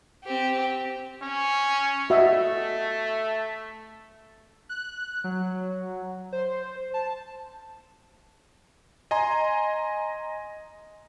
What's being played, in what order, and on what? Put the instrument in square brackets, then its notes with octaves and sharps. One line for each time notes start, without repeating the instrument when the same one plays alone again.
[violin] C4 G4
[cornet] C#4
[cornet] A3 [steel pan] F#4 D#5 E5
[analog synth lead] F#6
F#3
C5
A5
[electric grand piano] D#5 G#5 A#5 C6